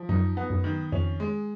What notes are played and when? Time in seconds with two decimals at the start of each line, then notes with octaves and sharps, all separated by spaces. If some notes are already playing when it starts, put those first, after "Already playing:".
Already playing: F3
0.09 F#2 D#4
0.37 B3
0.50 F#2
0.64 D#3
0.92 F2 C#4
1.20 G#3